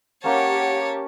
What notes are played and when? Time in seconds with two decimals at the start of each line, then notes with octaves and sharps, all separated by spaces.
0.24 A#3 C#4 G4 C#5 F#5 A5